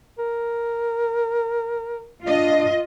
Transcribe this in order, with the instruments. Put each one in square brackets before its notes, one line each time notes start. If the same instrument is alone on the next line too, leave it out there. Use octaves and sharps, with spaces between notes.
[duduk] A#4
[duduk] D4 [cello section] F4 D#5